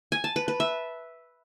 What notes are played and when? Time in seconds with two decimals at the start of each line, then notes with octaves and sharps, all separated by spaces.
0.12 G#5
0.24 A5
0.36 B4
0.48 B4
0.60 E5